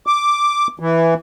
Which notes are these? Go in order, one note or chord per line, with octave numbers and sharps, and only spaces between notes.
D6
E3